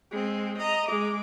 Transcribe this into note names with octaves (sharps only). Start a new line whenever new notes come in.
G#3 C4
D#5 A#5
G#3 D6